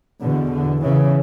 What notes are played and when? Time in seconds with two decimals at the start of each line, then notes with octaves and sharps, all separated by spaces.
0.22 E2 B2 D3
0.52 D3
0.83 C#3 E3